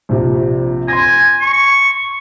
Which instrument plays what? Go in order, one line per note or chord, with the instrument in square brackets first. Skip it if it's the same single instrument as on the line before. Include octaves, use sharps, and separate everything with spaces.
[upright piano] A#1 C3 F3
[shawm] G#5 [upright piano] C6 A#6
[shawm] C#6